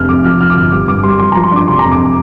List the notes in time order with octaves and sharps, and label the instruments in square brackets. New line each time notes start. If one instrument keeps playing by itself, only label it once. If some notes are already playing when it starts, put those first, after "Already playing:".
Already playing: [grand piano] F1 C3 D4 F6
F2 D6
F3 F6
F3 F6
D6
G1 F6
G3 D6
G2 D6
G3 C6
F3 C6
F3 A#5
C6
D4 D6
C3 C6
F2 A#5
D6